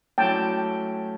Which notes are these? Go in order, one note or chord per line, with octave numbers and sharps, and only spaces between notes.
F#3 A3 C#4 E4 A4 G5 A5